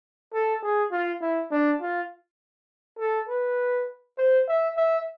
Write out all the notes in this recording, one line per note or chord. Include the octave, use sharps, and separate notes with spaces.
A4
G#4
F4
E4
D4
F4
A4
B4
C5
E5
E5